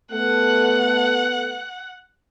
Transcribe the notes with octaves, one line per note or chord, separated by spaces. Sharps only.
A3 B3 A4 F#5